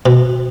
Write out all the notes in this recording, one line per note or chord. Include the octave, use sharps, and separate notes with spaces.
B2